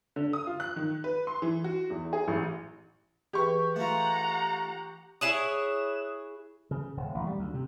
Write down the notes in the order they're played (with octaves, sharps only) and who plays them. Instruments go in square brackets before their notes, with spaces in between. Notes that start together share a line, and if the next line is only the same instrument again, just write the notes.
[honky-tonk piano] D3
D#6
F4
F#6
D#3
B4
C6
E3
F#4
E2
G#4
A1
[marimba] E3 G#4 B4 [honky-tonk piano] G4 C#6
[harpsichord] A3 F4 [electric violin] F#5 A#5
[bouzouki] E4 G#4 C#5 [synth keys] D#6 F#6 E7
[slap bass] C#3
D#1
A1
G3
D2
C3